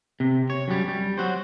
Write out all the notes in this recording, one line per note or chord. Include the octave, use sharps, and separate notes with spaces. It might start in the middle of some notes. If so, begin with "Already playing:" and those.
C3
C#5
F#2 G3
G3
F#3 F#4 C5